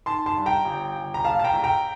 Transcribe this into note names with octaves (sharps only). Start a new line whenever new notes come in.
D#3 A5 C6
A5 C6
G2
G5 A#5
G1
G1
A#5
A#1 F5 A5
A5
G5 A#5
A#1
G5 A#5